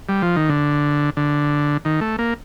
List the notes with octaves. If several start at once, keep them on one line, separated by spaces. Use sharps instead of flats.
G3
F3
D#3
D3
D3
D#3
A3
A#3